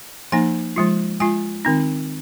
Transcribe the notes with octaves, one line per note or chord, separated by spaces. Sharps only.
F3 A#3 D#4 G#5
F3 G#3 F4
G#3 F4 G#5
D#3 C4 D#4